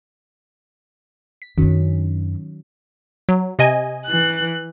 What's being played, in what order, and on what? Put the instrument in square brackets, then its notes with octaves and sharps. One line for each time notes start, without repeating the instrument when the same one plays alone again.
[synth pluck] B6
[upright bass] F#2 D4 [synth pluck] D#3 F#3 C#4
[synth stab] F#3
C3 D#5 G#5
[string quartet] E3 F#6